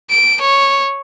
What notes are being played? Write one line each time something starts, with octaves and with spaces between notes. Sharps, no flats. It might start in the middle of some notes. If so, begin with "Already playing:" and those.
D7
C#5